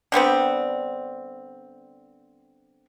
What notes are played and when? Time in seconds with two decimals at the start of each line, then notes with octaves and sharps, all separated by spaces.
0.12 D3 G3 B3 C4